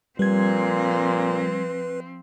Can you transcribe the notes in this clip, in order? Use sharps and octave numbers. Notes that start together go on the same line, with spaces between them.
A#2 F3 G3 C4 B4 G#6